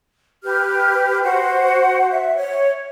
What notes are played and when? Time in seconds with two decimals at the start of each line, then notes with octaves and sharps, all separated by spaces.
0.43 G4 B4 F6
1.22 F#4 C5 F#5
2.10 E5
2.37 C#5